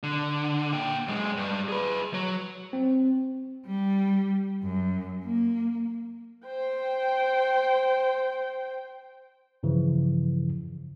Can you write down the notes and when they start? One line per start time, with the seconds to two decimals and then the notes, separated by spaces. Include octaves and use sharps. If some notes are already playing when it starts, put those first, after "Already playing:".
0.03 D3
0.73 A#2 G5
1.08 F#2 G#3
1.37 G2
1.68 G#4 B4
2.14 F#3
2.73 C4
3.66 G3
4.63 F#2
5.24 A#3
6.47 C5 G5
9.63 G2 C#3 E3 F3